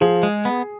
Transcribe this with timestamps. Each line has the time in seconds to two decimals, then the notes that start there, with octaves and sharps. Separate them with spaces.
0.01 F3 G#4
0.23 G#3
0.45 B3